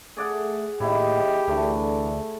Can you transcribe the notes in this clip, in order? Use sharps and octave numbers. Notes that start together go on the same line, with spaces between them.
A3 G#4 D5 F#5
D#2 A2 E4 G4 D#5
D2 D3 E3 A3 D4